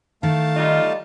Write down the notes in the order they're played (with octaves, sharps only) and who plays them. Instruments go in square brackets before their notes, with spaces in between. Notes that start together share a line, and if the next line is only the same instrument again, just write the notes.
[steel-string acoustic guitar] D#3 [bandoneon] A3 F5 A5
[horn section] G3 D#4 F4